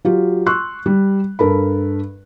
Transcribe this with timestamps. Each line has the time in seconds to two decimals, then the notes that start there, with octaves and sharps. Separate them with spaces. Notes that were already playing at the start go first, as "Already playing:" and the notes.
0.05 F#3 F4 G4
0.47 C6 C#6 E6 F#6
0.86 G3
1.39 G2 A4 A#4 B5